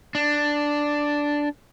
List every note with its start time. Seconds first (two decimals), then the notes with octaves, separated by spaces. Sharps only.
0.15 D4